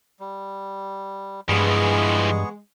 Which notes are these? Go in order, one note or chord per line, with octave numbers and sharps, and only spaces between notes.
G3
G2 E3 F3 G#3 B3 G#4 C#6